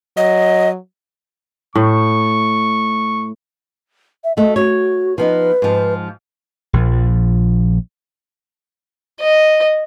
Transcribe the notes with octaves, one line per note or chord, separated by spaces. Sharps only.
F#3 D#5
A2 C#6
E5
A3 F#4 D#5
F#4 C#5
F3 B3 D#4 B4
G#2 F3
A#1 F3
D#5